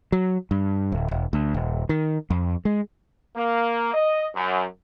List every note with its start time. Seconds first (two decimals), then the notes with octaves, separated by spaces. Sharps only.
0.12 F#3
0.51 G2
0.92 D1
1.11 E1
1.33 D2
1.54 D#1
1.89 D#3
2.30 F2
2.65 G#3
3.36 A#3
3.94 D#5
4.35 F#2